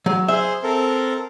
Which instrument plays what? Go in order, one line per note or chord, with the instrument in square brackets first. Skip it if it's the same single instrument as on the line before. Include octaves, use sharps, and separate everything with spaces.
[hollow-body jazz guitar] F#3
[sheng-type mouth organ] G#4 C5 [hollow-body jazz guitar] E5
[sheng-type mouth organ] C4 A4 A#4